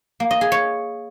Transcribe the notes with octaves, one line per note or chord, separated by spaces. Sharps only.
A#3
D#5
G#4
C#5